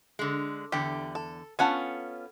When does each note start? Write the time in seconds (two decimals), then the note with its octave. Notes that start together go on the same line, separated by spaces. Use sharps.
0.19 D3 G#3
0.72 E2 D3 G4
1.15 A4
1.59 B3 C#4 F4 A4 F#5 G#5